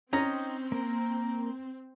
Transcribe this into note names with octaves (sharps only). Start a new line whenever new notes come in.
C4 C#4 D#4 D#5 G5 A#5
A#3 A#4